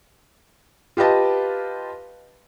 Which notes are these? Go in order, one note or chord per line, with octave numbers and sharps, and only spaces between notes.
F4 G4 B4 D#5 A5